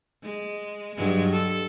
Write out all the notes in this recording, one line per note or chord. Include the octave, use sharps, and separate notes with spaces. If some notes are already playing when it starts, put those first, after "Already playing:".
G#3
G2 F#3 G#3
A4